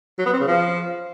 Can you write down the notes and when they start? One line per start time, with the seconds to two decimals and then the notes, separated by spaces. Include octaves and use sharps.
0.18 F#3
0.26 B3
0.33 C4
0.40 C#3
0.47 F3